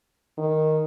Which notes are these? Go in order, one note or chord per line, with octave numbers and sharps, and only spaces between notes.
D#3